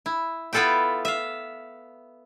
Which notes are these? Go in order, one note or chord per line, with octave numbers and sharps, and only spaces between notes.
E4
B3 E4 F4 A4 B4 G5
E5 F5